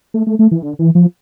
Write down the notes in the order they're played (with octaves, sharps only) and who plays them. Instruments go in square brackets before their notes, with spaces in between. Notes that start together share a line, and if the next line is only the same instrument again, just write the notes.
[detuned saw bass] A3
A3
A3
E3
D3
E3
F3